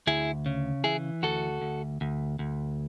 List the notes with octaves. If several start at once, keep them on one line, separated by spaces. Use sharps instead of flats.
D2 E4 G#4
C#3
E3 E4 G#4
D2 F#4 A4
D2
D2
D2